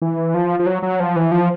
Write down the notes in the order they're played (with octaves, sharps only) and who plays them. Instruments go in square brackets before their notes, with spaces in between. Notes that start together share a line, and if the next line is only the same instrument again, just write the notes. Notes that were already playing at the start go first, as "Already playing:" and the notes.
[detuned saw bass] E3
F3
F3
F#3
F#3
F3
E3
F3